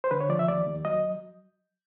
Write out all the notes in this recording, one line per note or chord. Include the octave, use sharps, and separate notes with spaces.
C5
D3 B4
C#5
F3 D5
E5
D#2 D5
D#2
F#3 D#5